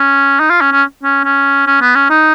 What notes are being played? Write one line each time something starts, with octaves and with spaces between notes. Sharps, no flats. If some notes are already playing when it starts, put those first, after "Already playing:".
Already playing: C#4
D#4
F4
C#4
C#4
C#4
C#4
C#4
B3
C#4
D#4